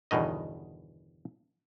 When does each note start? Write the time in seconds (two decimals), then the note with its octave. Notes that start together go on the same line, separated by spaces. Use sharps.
0.11 G1 E2 B2 D#3 D#5